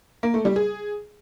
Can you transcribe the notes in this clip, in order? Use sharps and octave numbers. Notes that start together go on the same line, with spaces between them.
A#3
A3
G3
G#4